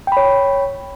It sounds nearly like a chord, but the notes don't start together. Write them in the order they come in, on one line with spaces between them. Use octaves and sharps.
G5 B5 C#5